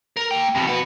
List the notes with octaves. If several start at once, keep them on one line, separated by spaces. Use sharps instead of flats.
A#4
A#3 G5
F2 B2
F#4 B4